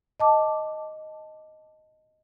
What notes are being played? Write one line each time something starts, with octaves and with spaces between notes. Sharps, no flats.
D#5 A5 D6